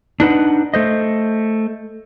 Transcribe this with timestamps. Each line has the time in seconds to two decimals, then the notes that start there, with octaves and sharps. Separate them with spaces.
0.20 D4 D#4 B4 F#5
0.74 A3 C5 D#5